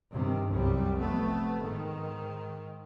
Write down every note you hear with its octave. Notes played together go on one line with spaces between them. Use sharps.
G2 C3 D#3
C2 F#2 G3
F1 A3 B3
G#2 D#3